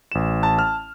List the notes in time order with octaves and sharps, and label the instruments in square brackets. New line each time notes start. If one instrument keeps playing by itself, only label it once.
[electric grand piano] A1 E7
[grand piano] A5
[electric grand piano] F6